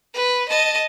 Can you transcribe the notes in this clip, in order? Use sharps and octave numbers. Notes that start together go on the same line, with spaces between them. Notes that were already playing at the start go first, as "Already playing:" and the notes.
B4
D#5 A5